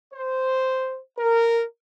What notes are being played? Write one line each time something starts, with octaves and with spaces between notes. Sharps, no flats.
C5
A#4